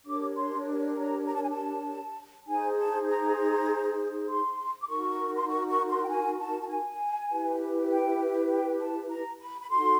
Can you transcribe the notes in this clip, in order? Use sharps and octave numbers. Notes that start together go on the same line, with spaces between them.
D4 G4 A#4 C#5 D6
C6
A#5
A#5
A5
G#5
A5
D#4 G#4 C5 G#5
A5
A#5
C6
D6
D#4 F#4 A#4 C#6
C6
C#6
C#6
C6
G5
G#5
A5
A5
G#5
E4 G4 B4
G5
G5
A5
A#5
B5
B5
D#4 F#4 A4 C6